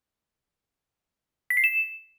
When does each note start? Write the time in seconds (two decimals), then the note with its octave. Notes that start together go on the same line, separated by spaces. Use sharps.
1.50 B6
1.57 C7
1.64 E7